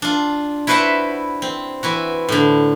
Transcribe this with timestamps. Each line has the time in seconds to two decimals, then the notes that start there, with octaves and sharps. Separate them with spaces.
0.02 D4 F4
0.67 E4 F#4 B4 C5 E5 F#5
1.42 C4
1.83 E3 E4 F#4
2.29 A2 D3